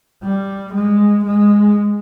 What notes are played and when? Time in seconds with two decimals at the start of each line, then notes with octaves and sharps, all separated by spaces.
0.23 G3
0.74 G#3
1.25 G#3